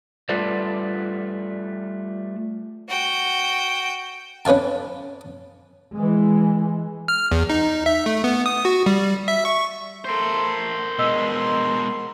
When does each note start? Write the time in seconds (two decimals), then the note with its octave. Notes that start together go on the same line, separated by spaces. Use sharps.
0.29 G3 A3 F4 A4 B4 D5
2.89 F#4 G5
4.45 C#4 B4 C#5 F5 A5
5.97 E3 G#3
7.08 F6
7.32 E2
7.50 D#4
7.86 E5
8.06 A3
8.24 B3
8.46 D#6
8.65 F#4
8.86 G3
9.28 E5
9.45 C#6
10.05 A3 A#4 C5 C6
10.99 B2 G#3 D#5 C6 E6 B6